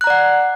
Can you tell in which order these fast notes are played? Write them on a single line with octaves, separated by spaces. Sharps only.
F#6 A#5 D5 F#5